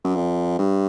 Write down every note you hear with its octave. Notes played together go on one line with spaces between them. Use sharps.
F#2
F2
G2